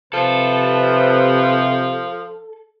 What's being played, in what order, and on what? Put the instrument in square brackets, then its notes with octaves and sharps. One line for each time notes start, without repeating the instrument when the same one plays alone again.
[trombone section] C3 [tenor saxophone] F3 [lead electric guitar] A4 [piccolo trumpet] B4